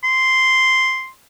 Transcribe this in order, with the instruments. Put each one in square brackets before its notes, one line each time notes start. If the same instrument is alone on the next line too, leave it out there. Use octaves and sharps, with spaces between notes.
[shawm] C6